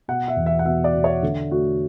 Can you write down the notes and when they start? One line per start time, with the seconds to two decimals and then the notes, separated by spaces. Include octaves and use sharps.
0.08 B2 F#5
0.28 E5
0.36 E2
0.46 E5
0.59 F#5
0.66 B2 E5
0.84 D5
0.94 B2
1.04 C#5
1.23 D3
1.51 A3 F#4